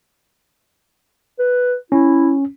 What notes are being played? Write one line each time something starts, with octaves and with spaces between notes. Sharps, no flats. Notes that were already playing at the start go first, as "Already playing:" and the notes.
B4
C#4 E4